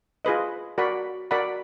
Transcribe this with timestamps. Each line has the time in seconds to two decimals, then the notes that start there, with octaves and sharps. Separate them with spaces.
0.25 F4 G#4 B4 D#5
0.78 F#4 A#4 D5 F#5 B5
1.31 F#4 A#4 D5 F#5 B5